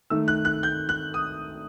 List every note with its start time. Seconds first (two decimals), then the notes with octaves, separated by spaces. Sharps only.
0.10 D#3 A3 E6
0.28 F#6
0.45 F#6
0.63 G6
0.89 F#6
1.14 D#6